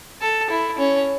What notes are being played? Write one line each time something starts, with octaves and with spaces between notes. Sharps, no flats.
A4
E4
C#4